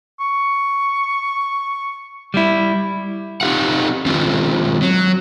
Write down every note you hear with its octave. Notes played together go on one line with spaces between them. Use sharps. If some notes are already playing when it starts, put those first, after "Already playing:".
C#6
G3 E4
C4 D#4 F#4 G4 F5 F#5
D#3 G#3 C4 C#4 F4
F#3